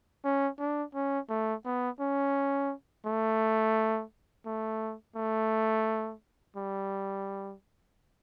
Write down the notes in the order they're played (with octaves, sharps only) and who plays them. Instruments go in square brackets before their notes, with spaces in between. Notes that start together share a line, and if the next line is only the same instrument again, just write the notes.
[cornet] C#4
D4
C#4
A3
B3
C#4
A3
A3
A3
G3